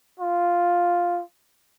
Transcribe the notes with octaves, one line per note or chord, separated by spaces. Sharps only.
F4